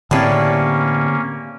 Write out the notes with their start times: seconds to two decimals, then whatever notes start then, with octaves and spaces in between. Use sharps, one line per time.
0.11 A2 D3 G3 A#3 C4 C#4 G#4 B4